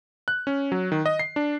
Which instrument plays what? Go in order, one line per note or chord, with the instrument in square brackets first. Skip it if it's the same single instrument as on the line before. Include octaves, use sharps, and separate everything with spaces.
[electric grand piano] F#6
C#4
F#3
D#3
D#5
C7
D4